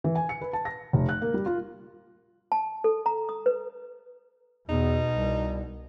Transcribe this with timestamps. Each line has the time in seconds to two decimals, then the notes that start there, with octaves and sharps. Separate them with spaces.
0.04 E3
0.15 G#5
0.29 C#7
0.41 B4
0.53 A5
0.65 A#6
0.93 F1
1.09 F#6
1.22 A#3
1.34 G3
1.46 F4
2.52 A5
2.84 A4
3.06 A#5
3.29 D#6
3.46 B4
4.69 E2 B2 D#4
5.10 C2